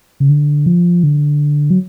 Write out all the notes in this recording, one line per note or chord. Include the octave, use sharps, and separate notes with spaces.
C#3
D3
F3
D3
F#3